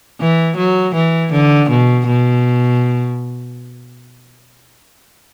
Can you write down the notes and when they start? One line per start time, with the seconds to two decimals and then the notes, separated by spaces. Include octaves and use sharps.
0.21 E3
0.57 F#3
0.95 E3
1.33 D3
1.70 B2
2.07 B2